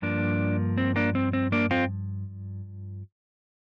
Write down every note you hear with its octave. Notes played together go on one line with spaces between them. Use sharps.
G2 F3 A#3 D4
C4
A#3 D4
C4
C4
A#3 D4
C4 F4